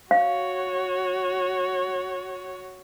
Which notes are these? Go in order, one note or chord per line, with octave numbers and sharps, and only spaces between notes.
F#4 C#5 F5